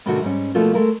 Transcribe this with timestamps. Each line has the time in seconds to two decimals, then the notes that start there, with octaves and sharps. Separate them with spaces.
0.06 A2 C3 D#3 A3 D4 F#4
0.22 G#2 G3 C#4
0.54 B2 F3 A3 A#3 F4 F#4
0.75 G#3 A3 A#4